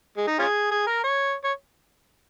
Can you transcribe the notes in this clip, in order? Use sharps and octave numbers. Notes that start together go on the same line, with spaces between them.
G#3
D#4
C#4 F4 G#4
G#4
A#4
C#5
C#5